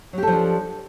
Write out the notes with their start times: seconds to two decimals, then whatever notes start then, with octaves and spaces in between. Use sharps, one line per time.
0.13 F#3
0.18 G4
0.23 A4
0.27 F3
0.32 D4